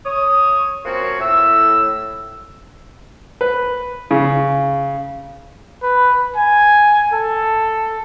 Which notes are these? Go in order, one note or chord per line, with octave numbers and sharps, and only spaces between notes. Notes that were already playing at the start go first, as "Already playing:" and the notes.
C#5 D#6
F3 A#3 C4 C#4 F#4 C#5
A2 E6
B4
C#3
B4
G#5
A4